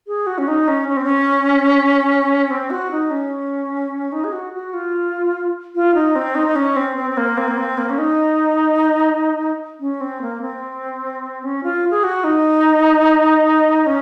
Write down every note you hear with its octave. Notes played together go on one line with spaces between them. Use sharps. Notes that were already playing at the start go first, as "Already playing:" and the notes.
G#4
F#4
C#4
D#4
C#4
C#4
C4
C#4
C4
F#4
D#4
C#4
D#4
G#4
F#4
F#4
F4
F4
D#4
C4
D#4
D#4
C#4
C4
C4
C4
A#3
C4
A#3
C4
A#3
C#4
D#4
C#4
C4
A#3
C4
C#4
F4
G#4
F#4
D#4
C#4